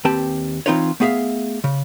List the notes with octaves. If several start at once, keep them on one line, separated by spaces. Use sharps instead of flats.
D#2 C4 G4 B4 A5
E3 C4 D#4 F4 B4 C#5
A3 B3 G#4 E5 F5
C#3